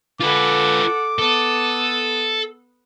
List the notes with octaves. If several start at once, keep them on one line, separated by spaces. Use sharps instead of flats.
F4 A4 B4 F#5 D6
B3 A4 D#6